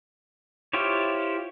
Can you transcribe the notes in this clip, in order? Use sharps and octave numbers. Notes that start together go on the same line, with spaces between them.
E4 F4 G4 C5 C#5